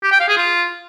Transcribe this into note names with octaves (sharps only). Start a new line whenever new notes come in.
G4
G5
F5
G#4
F4